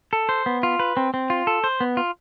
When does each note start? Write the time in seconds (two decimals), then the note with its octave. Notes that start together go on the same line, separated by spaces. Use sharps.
0.13 A4
0.29 C5
0.46 B3
0.63 F4
0.79 B4
0.97 C4
1.14 C4
1.30 F4
1.47 A4
1.64 C5
1.81 B3
1.97 F4